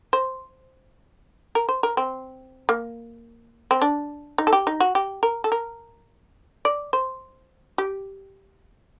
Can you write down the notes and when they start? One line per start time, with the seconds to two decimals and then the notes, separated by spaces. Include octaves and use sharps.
0.13 C5
1.55 A#4
1.69 C5
1.83 A#4
1.97 C4
2.69 A#3
3.71 C4
3.82 D4
4.38 D#4
4.47 A4
4.53 G4
4.67 D#4
4.80 F#4
4.95 G4
5.23 A#4
5.44 A4
5.52 A#4
6.65 D5
6.93 C5
7.78 G4